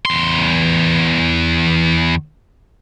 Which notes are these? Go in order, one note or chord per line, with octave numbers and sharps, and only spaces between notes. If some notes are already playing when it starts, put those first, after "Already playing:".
E2 C6